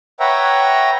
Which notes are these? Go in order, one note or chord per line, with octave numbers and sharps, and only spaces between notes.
B4 C#5 E5 F#5 G5 A#5